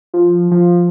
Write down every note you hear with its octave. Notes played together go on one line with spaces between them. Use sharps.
F3
F3